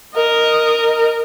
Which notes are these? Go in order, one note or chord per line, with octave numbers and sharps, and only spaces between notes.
A#4 D#5